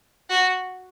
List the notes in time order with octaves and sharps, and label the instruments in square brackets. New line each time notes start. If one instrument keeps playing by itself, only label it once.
[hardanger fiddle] F#4